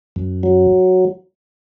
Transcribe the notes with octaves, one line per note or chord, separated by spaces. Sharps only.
F#2
F#3